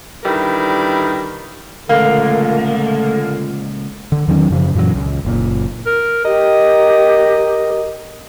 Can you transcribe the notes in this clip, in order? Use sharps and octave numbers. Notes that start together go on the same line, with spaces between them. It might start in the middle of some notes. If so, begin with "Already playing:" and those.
D3 D#3 G3 E4 A#4 B4
C#2 A#2 D3 F3 A3 A#3
D3
E2 D#3 F#3 C#4
F#2 C#3 F3
F#2 A#2 E3 F#3
C#2
F#1 A#2
A#4
G4 A#4 D#5